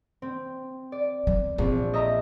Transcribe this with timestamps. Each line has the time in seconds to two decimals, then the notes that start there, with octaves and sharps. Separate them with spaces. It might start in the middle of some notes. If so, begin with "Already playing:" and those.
0.22 C4
0.92 D5
1.27 G3
1.58 A#1 C4
1.93 D#5 E5 A#5